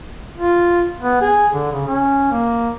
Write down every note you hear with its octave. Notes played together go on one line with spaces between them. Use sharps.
F4
B3
G#4
D3
C#3
C#4
A#3